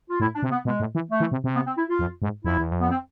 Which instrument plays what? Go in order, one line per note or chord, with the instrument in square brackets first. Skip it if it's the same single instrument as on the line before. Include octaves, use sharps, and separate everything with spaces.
[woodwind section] F4
[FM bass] A2 [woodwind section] E4
[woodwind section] D4
[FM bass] C3
[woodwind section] B3
[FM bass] B2 [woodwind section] G#3
[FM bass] A2
E3
[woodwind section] A3
[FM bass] E3
C3
C3
[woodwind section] B3
C4
E4
F4
[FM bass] F2
G#2
[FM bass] F2 [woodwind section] E4
[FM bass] E2
F2
[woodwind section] B3
C4